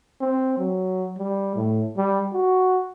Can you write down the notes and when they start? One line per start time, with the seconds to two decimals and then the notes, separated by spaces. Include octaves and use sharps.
0.21 C4
0.58 F#3
1.18 G3
1.56 A2
1.98 G3
2.33 F#4